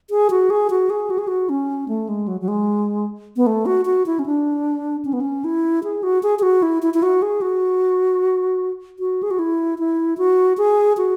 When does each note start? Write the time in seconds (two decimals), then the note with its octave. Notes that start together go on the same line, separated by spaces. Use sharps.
0.10 G#4
0.30 F#4
0.50 G#4
0.70 F#4
0.90 G#4
1.10 F#4
1.18 G#4
1.28 F#4
1.49 C#4
1.88 A3
2.09 G#3
2.28 F#3
2.41 F#3
2.48 G#3
3.36 B3
3.47 A3
3.66 F#4
3.86 F#4
4.06 E4
4.19 C#4
4.26 D4
5.05 C#4
5.13 B3
5.20 C#4
5.44 E4
5.84 G#4
6.03 F#4
6.23 G#4
6.39 G#4
6.43 F#4
6.63 E4
6.82 E4
6.94 E4
7.03 F#4
7.22 G#4
7.41 F#4
8.99 F#4
9.23 G#4
9.31 F#4
9.39 E4
9.79 E4
10.18 F#4
10.58 G#4
10.97 F#4